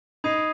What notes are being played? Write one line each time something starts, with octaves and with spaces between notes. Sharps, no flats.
D#4 B5 D#6 G#6 C7 D#7